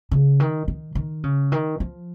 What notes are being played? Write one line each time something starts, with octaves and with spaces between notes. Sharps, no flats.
C#3
D#3
D#3
D#3
C#3
D#3
F3